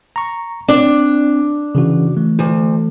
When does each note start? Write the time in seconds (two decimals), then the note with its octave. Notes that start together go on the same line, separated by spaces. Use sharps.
0.16 A#5 C#6
0.68 C4 D4 D5
1.75 C#3 E3 F#4
2.17 E3 A3
2.39 D2